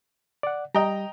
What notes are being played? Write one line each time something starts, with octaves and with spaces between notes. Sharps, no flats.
D5 F#5
G3 D#5 G5 A#5